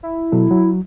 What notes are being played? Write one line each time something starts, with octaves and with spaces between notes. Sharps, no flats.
E4
B2 F#3 A4
F#3